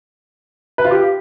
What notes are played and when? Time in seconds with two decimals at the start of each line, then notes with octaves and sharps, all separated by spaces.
0.78 B4
0.85 F4
0.91 G4